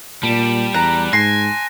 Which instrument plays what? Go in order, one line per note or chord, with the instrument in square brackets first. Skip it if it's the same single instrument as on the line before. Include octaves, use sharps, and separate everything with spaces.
[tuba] A#2 [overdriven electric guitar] G3 [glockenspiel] A5 D7 E7
[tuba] E2 [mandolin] A#5 [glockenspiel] F#6
[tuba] G#2 [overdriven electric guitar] G#5 [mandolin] C6 [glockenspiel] A#6